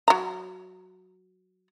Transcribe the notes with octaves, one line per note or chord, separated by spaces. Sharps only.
F#3 A#5